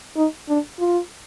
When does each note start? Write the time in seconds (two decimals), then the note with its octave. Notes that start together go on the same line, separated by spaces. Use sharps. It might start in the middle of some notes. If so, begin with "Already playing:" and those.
0.17 D#4
0.49 D4
0.80 F4